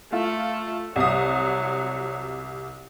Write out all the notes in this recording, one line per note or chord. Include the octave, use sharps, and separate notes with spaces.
A3 F4
C2 F#3 D#6